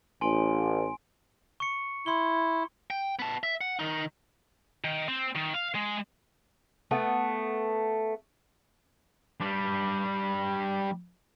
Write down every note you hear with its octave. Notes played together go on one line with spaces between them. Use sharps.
A1 G#5 C6 D7
C#6 C#7
E4 C6 G7
G5
B3 A5
E5
F#5
D#3 D#4
D#3
C4
D#3
F5
G#3
A3 B3
G3 D4